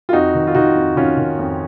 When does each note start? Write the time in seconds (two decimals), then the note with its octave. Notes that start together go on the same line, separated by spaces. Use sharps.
0.09 F4
0.13 F2 D#4 F#4
0.35 D#3
0.47 F4
0.55 D#3 D#4 F#4
0.76 F2
0.96 D#3 C#4 F4
1.17 D#3
1.39 F2